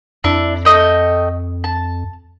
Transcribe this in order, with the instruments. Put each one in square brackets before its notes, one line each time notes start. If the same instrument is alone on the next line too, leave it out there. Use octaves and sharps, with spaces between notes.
[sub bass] F2 [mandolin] D4 E4
[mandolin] A3 D#5 G5
A5